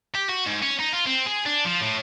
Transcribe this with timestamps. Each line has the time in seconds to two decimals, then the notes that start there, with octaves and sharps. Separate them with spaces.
0.15 G4
0.29 F#4
0.47 G#2
0.63 C#4
0.80 D#4
0.93 F4
1.06 C4
1.27 G#4
1.46 D4
1.65 F3
1.81 A2